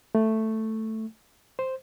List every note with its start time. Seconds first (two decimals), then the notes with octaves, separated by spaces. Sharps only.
0.15 A3
1.59 C5